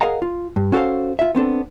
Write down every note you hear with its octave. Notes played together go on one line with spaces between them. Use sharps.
G#4 A#4 D#5 F5 F#5 A#5
F4
G2
C#4 F#4 A4 A#4 C5 F5
F4 E5
B3 C4 D4 A4